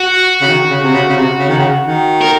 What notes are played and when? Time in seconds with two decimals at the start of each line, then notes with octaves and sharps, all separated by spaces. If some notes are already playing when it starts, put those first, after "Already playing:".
Already playing: F#4
0.41 C#3
0.48 D#3
0.70 C#3
0.84 C3
0.93 C#3
1.09 C#3
1.16 C3
1.39 C#3
1.48 D#3
1.58 C#3
1.85 D#3
2.22 A#4